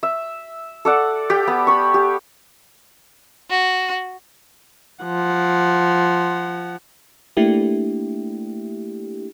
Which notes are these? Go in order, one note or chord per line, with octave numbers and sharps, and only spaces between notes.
E5
A4 D5 F#5
G4 G5
B3
B5 C#6
G4
F#4
F3 F#5
A3 A#3 D4 E4 G4